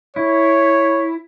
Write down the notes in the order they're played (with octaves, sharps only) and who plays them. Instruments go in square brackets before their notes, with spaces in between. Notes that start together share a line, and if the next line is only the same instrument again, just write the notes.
[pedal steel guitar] E4 [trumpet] C#5